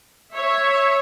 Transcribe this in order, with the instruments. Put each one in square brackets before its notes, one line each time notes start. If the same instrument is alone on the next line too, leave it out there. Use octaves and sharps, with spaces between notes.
[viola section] C#5 E5